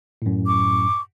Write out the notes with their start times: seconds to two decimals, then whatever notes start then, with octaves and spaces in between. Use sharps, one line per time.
0.22 F#2 A2
0.47 C#6 D6